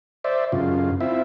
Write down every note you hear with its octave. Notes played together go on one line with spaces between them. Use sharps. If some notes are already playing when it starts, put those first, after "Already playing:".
C5 D5 E5
F#2 C#3 F4
C4 E4 F4 E5